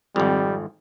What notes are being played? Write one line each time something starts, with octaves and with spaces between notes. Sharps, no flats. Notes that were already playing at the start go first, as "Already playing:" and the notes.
G#1 F2 G3